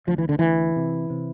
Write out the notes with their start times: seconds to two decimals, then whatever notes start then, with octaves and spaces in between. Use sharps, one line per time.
0.07 D2 F3
0.18 E3
0.29 D3
0.39 D2 E3
0.76 C3
1.10 C3